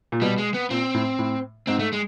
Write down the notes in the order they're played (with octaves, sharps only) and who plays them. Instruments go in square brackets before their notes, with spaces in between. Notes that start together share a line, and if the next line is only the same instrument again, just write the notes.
[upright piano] A#2
[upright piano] B2 [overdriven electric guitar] G3
[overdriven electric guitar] G#3
B3
[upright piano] A#2 [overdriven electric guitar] C4
[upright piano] A2
A2
[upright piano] G#2 [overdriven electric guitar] C4
[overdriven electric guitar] A3
G#3